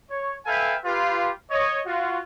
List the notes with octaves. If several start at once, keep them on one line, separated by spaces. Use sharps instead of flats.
C#5
A4 B4 E5 F5 G5 G#5
F4 G4 B4
C#5 D#5
F4 F#4